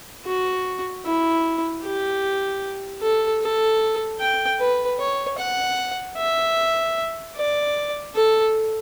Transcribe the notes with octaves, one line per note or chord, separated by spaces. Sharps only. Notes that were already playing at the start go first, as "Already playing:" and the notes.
F#4
E4
G4
A4
A4
G5
B4
C#5
F#5
E5
D5
A4